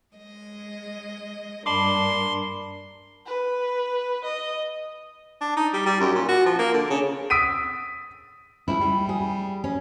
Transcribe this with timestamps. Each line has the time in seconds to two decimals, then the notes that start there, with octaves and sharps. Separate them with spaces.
0.14 G#3 D#5
1.66 G2 A#3 D4 A5 B5 C6 D6
3.26 B4
4.24 D#5
5.41 D4
5.57 D#4
5.73 G3
5.86 G3
6.00 F#2
6.15 A#2
6.29 F#4
6.46 F3
6.59 A#3
6.73 D3
6.90 C#3
7.30 D#6 E6 B6 D7 D#7
8.68 C#2 E4
8.80 G3
9.09 G#4
9.64 C#4